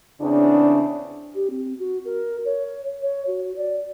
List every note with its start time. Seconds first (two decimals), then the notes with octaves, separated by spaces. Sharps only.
0.21 E2 C#3 C4 D4
1.35 G4
1.50 C4
1.79 F#4
2.05 A#4
2.45 C#5
3.02 C#5
3.27 F#4
3.56 D5